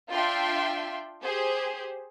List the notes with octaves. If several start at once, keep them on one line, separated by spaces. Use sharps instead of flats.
D4 F4 E5 G5 C6
G4 G#4 C5